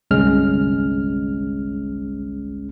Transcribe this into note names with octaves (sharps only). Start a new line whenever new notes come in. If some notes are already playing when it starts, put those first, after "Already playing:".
G1 C2 G#3 C#4 F6